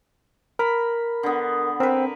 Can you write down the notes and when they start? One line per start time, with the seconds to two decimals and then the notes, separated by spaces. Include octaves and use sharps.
0.59 A#4 B5
1.23 D3 B3
1.80 C4 A#4 B4